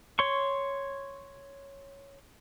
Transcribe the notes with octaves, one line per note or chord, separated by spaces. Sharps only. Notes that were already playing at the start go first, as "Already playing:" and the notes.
C#5 C6 C#6